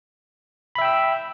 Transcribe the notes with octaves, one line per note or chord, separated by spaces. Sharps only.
E5 G5 B5 E6